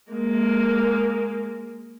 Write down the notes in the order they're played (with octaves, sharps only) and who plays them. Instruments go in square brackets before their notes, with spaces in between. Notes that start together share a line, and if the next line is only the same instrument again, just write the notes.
[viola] G#3 A#3